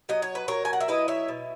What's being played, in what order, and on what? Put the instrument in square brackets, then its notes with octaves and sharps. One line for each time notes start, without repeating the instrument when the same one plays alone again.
[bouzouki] F#3 D#5
C#5
B4
F#3 A#4 C#5
G#5
F#5
E5
E4 B4 D#5
C#5 E5
B2